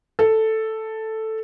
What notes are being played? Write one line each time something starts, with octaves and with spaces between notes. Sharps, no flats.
A4